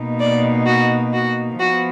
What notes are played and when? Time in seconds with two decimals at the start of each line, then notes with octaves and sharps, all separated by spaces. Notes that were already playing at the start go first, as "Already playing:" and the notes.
Already playing: B2 A#3 D#4
0.20 D5
0.66 F#4
1.13 F#4
1.58 F3 B3 F#4